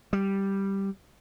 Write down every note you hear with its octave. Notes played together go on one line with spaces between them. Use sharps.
G3